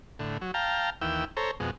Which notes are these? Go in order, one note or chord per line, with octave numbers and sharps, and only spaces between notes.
A2 D3
F#3
F5 G5 A5 A#5
D#2 E3 G5 E6
A4 C5 C#5 A#5
F2 B2 G#3